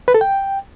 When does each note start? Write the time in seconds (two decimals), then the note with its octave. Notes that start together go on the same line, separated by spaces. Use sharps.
0.08 B4
0.14 A4
0.21 G5